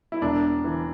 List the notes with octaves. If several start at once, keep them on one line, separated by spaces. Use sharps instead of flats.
E4
E1 D4
E3